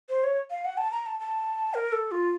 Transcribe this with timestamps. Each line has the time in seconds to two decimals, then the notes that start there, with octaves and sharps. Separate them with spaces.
0.09 C5
0.24 C#5
0.51 F5
0.65 F#5
0.78 A5
0.92 A#5
1.06 A5
1.20 A5
1.74 A#4
1.92 A4
2.11 F4